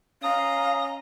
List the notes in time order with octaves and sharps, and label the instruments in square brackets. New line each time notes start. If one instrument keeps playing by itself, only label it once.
[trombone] C#4 [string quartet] D#5 A#5 [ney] F5 [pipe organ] D#6